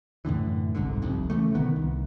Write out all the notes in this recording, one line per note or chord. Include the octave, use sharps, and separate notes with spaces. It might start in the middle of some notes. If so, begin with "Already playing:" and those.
F#2 A2 D3 E3
G1 C2 G#2 D3
F1 C2 F2
C#3 E3 G3 A3
B1 D3 D#3 B3
C2